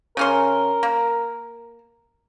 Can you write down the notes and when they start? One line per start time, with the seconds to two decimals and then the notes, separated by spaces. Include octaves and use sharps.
0.17 C#3 C#4 A#4 C6
0.83 A#3